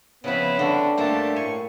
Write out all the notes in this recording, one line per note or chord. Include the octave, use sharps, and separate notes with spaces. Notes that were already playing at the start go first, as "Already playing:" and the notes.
C#3 F3 B3 C4 E4
D3 G3 B3 D4 F#4
G2 A3 A#3 G4 C5 A5
A2 G#5 C#6